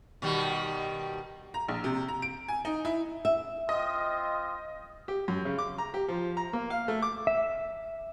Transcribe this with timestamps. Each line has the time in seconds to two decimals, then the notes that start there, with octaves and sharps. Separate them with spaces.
0.22 B2 D#3 G3
1.54 A#5
1.68 A#1
1.84 C3
2.08 A#5
2.22 D7
2.48 G#5
2.65 D#4
2.85 E4
3.25 E5
3.69 C4 F4 D#5 D#6
5.08 G4
5.28 F#2
5.45 C#3
5.58 D6
5.78 A#5
5.94 G4
6.08 F3
6.37 A#5
6.53 A#3
6.70 F5
6.88 A3
7.02 D6
7.27 E5